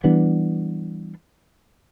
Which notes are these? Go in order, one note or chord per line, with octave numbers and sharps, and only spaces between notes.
E3 G3 B3 D4